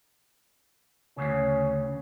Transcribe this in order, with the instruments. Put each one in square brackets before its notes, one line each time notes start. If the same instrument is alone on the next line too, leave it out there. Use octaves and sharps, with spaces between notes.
[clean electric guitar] D2 C#3 [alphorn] C#4